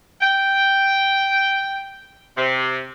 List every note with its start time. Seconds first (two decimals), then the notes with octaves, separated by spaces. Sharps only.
0.21 G5
2.36 C3